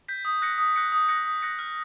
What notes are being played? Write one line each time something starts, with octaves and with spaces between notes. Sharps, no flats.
G6 B6
D#6
F#6 A#6 C#7
D#6
F#6 A#6 C#7
D#6
F#6 A#6 C#7
D#6
F#6 A#6 C#7
F6